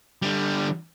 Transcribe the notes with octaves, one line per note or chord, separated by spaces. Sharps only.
D3 G3